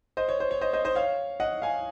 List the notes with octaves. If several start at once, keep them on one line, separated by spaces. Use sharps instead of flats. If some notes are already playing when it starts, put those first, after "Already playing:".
C5 D#5
C#5
C5
C#5
C5 D#5
C5 D#5
C5 D#5
C#5 F5
D#5 F#5
F5 G#5